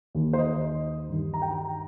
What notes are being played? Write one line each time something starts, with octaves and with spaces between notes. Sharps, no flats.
D#2 D#3
C5
D#5
G2 D#3
A#5
G5
A#5